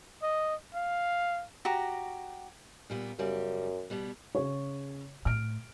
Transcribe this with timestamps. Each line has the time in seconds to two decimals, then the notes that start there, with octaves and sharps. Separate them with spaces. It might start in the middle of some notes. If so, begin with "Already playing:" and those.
0.22 D#5
0.74 F5
1.65 F#4 G4 A#5
2.90 A#2 G3 B3
3.19 F#2 C#3 G3
3.90 B2 G3 B3
4.35 C#3 G#4 C#5
5.25 A2 F6 D7